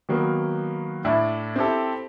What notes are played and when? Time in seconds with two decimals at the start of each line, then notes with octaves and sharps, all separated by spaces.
0.09 D#3 F#3 A#3 B3
1.05 A2 D4 E4
1.56 C4 E4 G4 A4